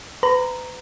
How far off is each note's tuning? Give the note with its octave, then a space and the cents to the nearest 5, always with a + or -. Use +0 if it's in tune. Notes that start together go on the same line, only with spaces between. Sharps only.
B4 +35 A#5 +0